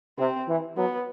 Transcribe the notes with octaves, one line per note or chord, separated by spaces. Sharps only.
C3 C4
E3
F#3 B3